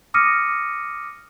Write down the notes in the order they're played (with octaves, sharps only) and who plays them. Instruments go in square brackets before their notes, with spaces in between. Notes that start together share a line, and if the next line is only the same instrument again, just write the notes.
[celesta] D6 D#6 F6 A#6 C#7 D#7